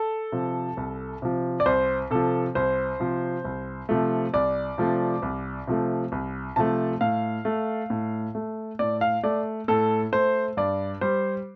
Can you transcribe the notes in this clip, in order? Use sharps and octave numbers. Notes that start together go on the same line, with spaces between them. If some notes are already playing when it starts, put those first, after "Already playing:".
Already playing: A4
C3 F3
C2
C3 F3
D5
C2 C5
C3 F3 A4
C2 C5
C3 F3
C2
C3 F3 A3
C2 D5
C3 F3 A3
C2
C3 F3 A3
C2
C3 F3 A3 A5
A2 F5
A3
A2
A3
A2 D5
F5
A3 D5
A2 A4
A3 C5
G2 D5
G3 C5